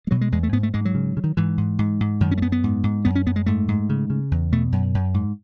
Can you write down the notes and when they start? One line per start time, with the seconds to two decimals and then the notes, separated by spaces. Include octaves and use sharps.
0.07 G#3
0.11 B2 F#3
0.21 G#3
0.32 E2 G#3
0.43 A3
0.53 G#2 B3
0.63 A3
0.74 G#2 G#3
0.85 F#3
0.95 C#3
1.17 C#3
1.24 D#3
1.37 G#2 E3
1.58 G#2
1.79 G#2
2.00 G#2
2.20 F#2 D#3
2.31 C#4
2.37 A3
2.42 F#2 B3
2.52 B3
2.64 G#2
2.84 G#2
3.05 F#2 B3
3.15 C#4
3.26 F#2 B3
3.36 G#3
3.46 G#2 A3
3.68 G#2
3.89 C#3
4.10 C#3
4.31 E2
4.52 B2 A3
4.72 F#2
4.94 F#2
5.14 G#2